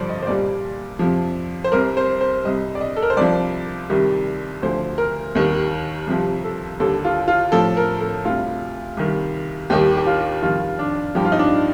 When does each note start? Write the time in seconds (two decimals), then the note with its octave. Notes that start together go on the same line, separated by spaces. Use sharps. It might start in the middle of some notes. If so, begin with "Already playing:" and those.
Already playing: G2 D3 F3 C5 D5
0.09 D#5
0.22 C5
0.27 C2 A#2 G3 D5
0.99 F2 C3 F3
1.64 C5
1.72 C2 C3 G3 A#4
1.97 C5
2.21 C5
2.44 C2 C3 G3 D#5
2.75 D5
2.81 D#5
2.96 A4
3.02 A#4
3.10 C5
3.17 C2 C3 F3 D5
3.90 C2 C3 D#3 G3
4.62 D2 D3 F3 C5
4.98 A#4
5.35 D#2 D#3 G3
6.07 C2 C3 F3
6.44 A4
6.80 D#2 D3 G3 A4
7.05 F4
7.28 F4
7.52 A2 F3 A4
7.77 A#4
8.00 A4
8.25 D2 C3 G3 F4
8.97 C2 C3 D#3 G3
9.70 D#2 D#3 G3 G4
9.97 G4
10.07 F4
10.43 F2 D#3 G3 F4
10.79 D4
11.15 G2 F3 G4
11.25 F4
11.32 D#4
11.39 D4